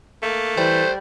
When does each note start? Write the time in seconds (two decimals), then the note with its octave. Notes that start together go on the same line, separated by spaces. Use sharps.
0.22 A3 A#3
0.57 E3 G3 C5